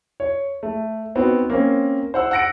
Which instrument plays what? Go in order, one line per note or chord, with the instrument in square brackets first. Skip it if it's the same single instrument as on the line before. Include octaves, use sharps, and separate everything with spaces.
[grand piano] C#5
A3
B3 C4 D#4 F#4
A#3 C4 C#4
C5 F#5 E6
F#5 E6 A#6 C#7 D7